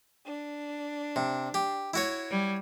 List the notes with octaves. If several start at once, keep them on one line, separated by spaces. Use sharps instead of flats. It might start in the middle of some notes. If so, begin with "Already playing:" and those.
D4
C3
G4
E4 F#4 C#5
G3